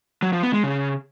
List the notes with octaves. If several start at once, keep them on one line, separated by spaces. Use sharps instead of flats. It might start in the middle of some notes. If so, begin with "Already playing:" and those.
F#3
F3
B3
G#3
C#3